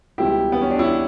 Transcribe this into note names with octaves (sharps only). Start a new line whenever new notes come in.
C#2 B2 G3 E4 G4
B3
C#4
D4
C#4 E4